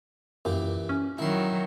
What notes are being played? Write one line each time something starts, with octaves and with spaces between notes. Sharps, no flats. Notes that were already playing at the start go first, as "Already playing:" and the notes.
F#2 A#2 E3 G4
C#4
D#3 F#3 E4 C6